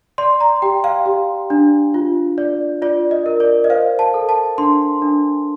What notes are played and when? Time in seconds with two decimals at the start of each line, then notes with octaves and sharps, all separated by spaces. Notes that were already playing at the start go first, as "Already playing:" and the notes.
0.18 D5 C6
0.40 A#5
0.62 G4 G5
0.84 F5
1.06 G4
1.50 D4
1.94 F4
2.38 D5
2.82 F4 D5
3.11 D#5
3.26 A#4
3.40 D5
3.64 D#5
3.70 C5 F5
3.99 A5
4.14 A4
4.29 A5
4.58 D4 C6
5.02 D4